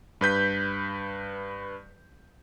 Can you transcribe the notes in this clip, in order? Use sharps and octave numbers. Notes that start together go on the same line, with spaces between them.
G2 B4 G6 B6